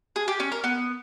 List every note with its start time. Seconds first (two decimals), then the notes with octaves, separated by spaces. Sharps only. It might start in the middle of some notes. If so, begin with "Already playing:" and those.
0.16 G#4
0.28 G4
0.40 C#4
0.52 A#4
0.64 B3